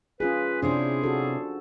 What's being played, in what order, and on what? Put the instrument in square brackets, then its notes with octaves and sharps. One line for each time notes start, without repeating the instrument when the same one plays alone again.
[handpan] C#4 F4 G#4 [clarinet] B4
[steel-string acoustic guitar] C3 C#4 E4 [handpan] D4 C5 [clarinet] G#4
[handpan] F#4 A4